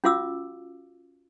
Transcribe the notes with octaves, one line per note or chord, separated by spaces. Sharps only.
C#4 F4 F#4 F5 D6 E6